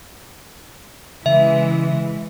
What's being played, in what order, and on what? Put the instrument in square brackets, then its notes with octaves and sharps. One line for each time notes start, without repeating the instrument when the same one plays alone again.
[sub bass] C#3 [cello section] E3 G#3 [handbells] E5